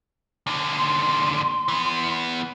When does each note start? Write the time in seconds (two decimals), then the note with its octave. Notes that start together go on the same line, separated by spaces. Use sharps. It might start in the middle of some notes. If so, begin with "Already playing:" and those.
0.47 D#2 D3
0.76 C6
1.68 E3 B3